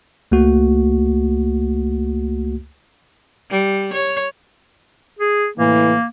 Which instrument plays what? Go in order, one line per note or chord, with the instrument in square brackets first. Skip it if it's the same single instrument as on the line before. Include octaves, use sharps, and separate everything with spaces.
[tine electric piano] C#2 A3 A#3 F#4
[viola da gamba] G3
C#5
[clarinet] G#4
[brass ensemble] A2 C3 E3 [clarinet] A#3